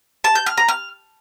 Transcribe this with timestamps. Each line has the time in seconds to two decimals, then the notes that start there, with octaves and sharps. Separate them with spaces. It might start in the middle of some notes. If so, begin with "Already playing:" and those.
0.24 A5
0.35 G6
0.46 F6
0.57 A#5
0.68 F6